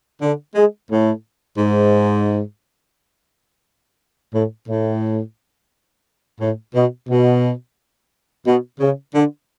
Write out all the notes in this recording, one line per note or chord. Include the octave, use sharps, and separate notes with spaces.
D3
G#3
A2
G#2
A2
A2
A2
B2
B2
B2
C#3
D3